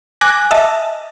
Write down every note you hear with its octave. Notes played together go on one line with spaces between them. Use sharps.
G#5 D6 F#6 A#6
D#5 E5 A5